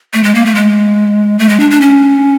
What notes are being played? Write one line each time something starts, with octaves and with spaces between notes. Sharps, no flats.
A3
G#3
A#3
A3
G#3
A3
G#3
D4
D4
C#4